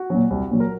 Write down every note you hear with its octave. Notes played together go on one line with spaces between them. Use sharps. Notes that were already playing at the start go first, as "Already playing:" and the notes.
Already playing: F#4
A#2 F#3
C2
A#2 F#3
A#4